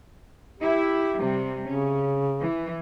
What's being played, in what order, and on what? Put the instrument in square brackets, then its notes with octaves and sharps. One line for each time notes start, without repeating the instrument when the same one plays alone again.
[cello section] E4 [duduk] G4
[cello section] C3 G3
[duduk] C#3 [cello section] C#4
[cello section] E3